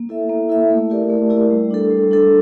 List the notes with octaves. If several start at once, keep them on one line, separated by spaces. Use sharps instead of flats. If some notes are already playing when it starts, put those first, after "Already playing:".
Already playing: A#3
E4 A4 E5
A#3
E4 A4 E5
A3
E4 G4 A#4 D5
A3
E4 G4 A#4 D5
G3
D4 A4
G3
D4 A4